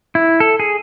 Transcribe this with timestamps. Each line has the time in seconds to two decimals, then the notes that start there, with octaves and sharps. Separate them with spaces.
0.15 E4
0.40 A4
0.60 G#4